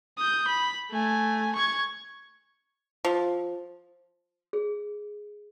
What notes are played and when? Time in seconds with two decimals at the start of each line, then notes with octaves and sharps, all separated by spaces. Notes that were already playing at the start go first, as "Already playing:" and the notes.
0.18 D#6 G6
0.47 B5
0.92 A3 G#5
1.55 C#6 G#6
3.05 F3
4.53 G#4